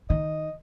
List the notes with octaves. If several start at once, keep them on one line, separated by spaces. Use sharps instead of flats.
D#3 D#5